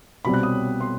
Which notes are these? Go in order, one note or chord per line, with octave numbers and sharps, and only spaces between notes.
C2 B2 G3 C4 B5
F#6
D#6
C6